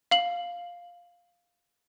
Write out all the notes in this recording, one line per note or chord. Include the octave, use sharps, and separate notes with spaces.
F5 F#7